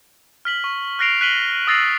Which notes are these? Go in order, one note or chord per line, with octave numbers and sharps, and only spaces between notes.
F6 B6 F#7
C#6
F6 F#6 A#6 C7 D7 F7
F#6 B6 D#7 F#7 G7
D#6 E6 A6 A#6 C7 F#7